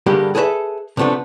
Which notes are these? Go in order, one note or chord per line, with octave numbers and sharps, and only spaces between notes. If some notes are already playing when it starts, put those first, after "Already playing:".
G2 D3 G3 G#3 A#3 G4
G#4 A4 B4 C5 E5
C3 F3 A3 B3 D4